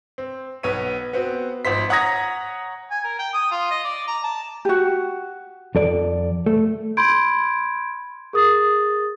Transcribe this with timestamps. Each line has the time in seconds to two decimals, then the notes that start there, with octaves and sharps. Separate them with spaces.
0.18 C4
0.63 B1 B3 C#5 D#7
1.13 B3 C4 F#4
1.65 G#1 F3 C5 B6
1.89 C#5 F#5 A#5 D#6 G#6 A#6
2.91 G#5
3.04 A#4
3.19 G5
3.34 D#6
3.51 F4
3.71 D#5
3.84 D5
4.08 A#5
4.24 A5
4.65 F#4 G4
5.75 F2 A4 D5
6.46 A3
6.97 B5 C6 G6 G#6 D7
8.33 G#4 A#4 D#6 A6